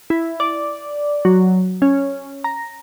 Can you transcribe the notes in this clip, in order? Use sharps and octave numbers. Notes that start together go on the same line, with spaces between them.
E4
D5
F#3
C#4
A#5